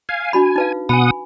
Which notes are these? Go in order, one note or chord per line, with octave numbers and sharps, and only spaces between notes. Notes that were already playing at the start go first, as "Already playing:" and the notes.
F5 G#5
D4 F#4 G#5 B5
D#4 B4 F5
B2 F#5 G#5 B5 D#6